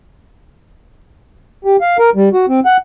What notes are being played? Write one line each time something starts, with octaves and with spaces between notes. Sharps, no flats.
G4
F5
A#4
G3
F#4
C4
F#5